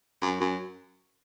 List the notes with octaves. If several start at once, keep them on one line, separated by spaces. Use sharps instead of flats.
F#2
F#2